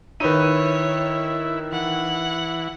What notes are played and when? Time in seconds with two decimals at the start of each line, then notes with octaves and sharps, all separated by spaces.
0.20 D#3 D#4 E4 B4 C#5 D#7
1.72 E3 F#5